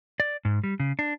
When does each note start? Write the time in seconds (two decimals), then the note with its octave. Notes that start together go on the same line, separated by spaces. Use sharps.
0.20 D5
0.45 G#2
0.64 G3
0.80 C#3
0.99 D4